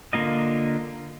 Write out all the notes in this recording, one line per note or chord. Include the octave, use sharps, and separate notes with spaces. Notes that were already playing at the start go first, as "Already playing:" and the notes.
D3 A#3 F4 D#5